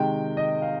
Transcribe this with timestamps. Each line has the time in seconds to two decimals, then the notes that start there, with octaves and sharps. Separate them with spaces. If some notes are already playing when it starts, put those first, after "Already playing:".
Already playing: C3 D#3 G#3 G5
0.37 D#5
0.62 F5